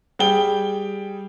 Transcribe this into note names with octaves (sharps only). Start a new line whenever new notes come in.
G3 G#4 G5 G7